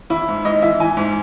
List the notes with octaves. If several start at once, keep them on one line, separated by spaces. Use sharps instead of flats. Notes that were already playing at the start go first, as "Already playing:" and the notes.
E3 E4
G#2
G#2 D#5
E3 E5
E3 G#5
G#2